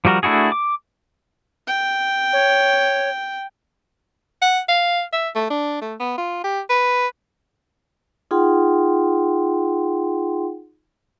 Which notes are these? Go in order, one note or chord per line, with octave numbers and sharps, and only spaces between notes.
F3 G3 F#4 A#4
A3 D4 E4 F#4 G#4
D6
G5
C#5
F#5
F5
E5
A3
D4
A3
B3
F4
G4
B4
D#4 F4 G#4 F#5 G5 C6